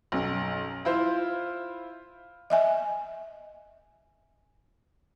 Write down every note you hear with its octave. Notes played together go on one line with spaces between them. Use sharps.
B1 F#2
E4 F4 C5 C6
D#5 E5 G#5